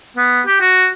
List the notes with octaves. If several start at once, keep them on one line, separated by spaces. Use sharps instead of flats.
B3
G4
F#4